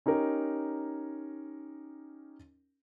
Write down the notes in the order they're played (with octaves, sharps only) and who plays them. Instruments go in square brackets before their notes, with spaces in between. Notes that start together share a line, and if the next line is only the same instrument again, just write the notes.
[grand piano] C#4 D#4 G4 A#4